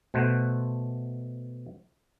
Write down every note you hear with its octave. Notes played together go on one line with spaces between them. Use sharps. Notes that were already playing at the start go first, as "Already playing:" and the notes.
B2 A3 C5 F#5